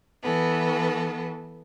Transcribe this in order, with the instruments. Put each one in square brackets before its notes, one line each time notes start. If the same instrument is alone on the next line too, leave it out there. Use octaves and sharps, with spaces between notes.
[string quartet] E3 B3 A4